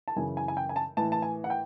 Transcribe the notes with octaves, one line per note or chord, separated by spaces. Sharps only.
A5
F#2 C#3 E3 G#5
G#5
G#5
G5
G#5
A5
A2 E3 A5
A5
G#5
F#5
G5